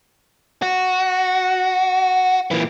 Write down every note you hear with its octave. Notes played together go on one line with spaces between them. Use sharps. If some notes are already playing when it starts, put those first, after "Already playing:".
F#4
A#2 E3